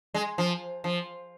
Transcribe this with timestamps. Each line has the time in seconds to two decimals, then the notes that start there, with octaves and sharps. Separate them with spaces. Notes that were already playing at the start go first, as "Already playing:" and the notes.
0.14 G#3
0.38 F3
0.84 F3